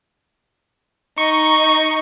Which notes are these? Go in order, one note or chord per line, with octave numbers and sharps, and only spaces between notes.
D#4 C#6